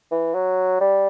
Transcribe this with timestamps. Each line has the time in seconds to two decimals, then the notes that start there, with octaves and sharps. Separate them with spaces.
0.11 E3
0.34 F#3
0.81 G3